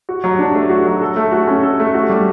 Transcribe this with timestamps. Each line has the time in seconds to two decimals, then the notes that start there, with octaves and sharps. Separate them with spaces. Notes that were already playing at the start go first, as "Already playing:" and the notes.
0.09 F#4
0.24 F#3
0.39 D4
0.55 A3
0.70 F#4
0.86 F#3
1.02 A4
1.16 A3
1.32 F#4
1.47 C#4
1.63 A4
1.80 A3
1.94 F#4
2.10 G3